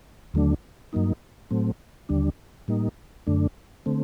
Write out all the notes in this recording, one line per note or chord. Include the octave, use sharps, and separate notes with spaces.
D#2 D3 F#3 A3 D4
G2 F#3 A#3 D#4
A2 F#3 A3 C4
D#2 D3 G3 D4
A2 G3 A#3 D#4
F#2 D3 A3 D4
D3 A3 C4